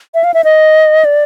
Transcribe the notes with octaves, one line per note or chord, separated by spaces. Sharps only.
E5
F5
E5
D#5
D5